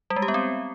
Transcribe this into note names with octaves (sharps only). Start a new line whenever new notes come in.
G3
G#3
G4
B3
C4